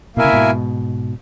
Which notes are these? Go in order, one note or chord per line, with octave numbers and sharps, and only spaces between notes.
B2 A#3 E4 A#4 E5 G#5
C#3
G#2 B2